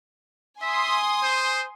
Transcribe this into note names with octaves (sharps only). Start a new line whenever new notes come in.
E5 G#5 C6 D#6
C5